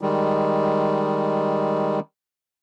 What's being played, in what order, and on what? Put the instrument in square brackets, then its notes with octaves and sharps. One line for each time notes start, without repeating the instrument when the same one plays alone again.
[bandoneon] D#3 G3 G#3